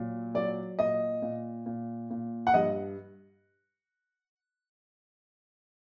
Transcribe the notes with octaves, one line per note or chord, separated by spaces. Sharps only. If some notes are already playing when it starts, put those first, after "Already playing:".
Already playing: A#2 F#3
F#3 D5
A#2 D#5
A#2
A#2
A#2
F#5
G2 D#5